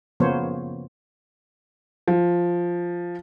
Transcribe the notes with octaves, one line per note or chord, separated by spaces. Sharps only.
C#3 F3 A#3 B3 C5 C#5
F3